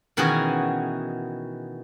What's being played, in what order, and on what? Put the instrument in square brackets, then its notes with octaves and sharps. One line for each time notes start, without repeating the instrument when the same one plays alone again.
[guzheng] B2 D#3 E3 C#4 F#4 G#4